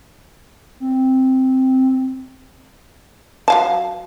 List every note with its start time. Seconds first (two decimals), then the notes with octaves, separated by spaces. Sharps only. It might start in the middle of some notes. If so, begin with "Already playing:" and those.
0.80 C4
3.48 F#3 F5 A5